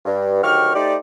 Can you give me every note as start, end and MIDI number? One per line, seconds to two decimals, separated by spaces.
0.06 0.42 43
0.43 0.73 38
0.43 0.73 51
0.43 0.73 54
0.43 0.73 67
0.43 0.73 85
0.43 0.73 89
0.75 0.96 57
0.75 0.96 63
0.75 0.96 67
0.75 0.96 72
0.75 0.96 74